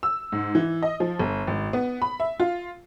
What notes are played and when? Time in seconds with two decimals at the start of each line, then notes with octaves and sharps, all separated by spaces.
0.03 E6
0.32 G#2
0.55 E3
0.82 D#5
1.00 F3
1.19 G1
1.47 G#1
1.73 B3
2.02 B5
2.20 E5
2.40 F4